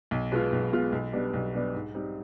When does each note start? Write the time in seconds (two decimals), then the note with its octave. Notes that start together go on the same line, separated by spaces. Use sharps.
0.11 B1
0.32 B2 G#3 B3 F4
0.52 B1
0.72 B2 G#3 B3 F4
0.92 B1
1.13 B2 G3 B3 D4
1.34 B1
1.54 B2 G3 B3 D4
1.74 G#2
1.95 G3 C4 D#4